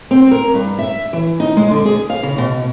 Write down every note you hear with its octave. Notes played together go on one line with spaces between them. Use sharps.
C4
A#4
G2
E5
E3
D#4
G#3
D3
G#4
F5
C#3
B2